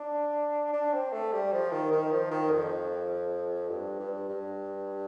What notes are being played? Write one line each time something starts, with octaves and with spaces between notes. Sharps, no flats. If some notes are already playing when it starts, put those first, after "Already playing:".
Already playing: D4
D4
C4
A3
G3
F3
D#3
D#3
F3
D#3
F2
G2
G2
G2